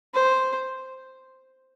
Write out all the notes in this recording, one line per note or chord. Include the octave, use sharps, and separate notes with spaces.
C5